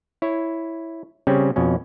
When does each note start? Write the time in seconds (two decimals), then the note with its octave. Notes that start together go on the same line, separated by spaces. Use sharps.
0.22 E4 C#5
1.27 C#3 G3 C4 C#4
1.56 F2 B2 C#4